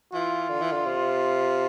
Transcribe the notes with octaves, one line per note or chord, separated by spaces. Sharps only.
E3 F4
D3
E3
D3
C3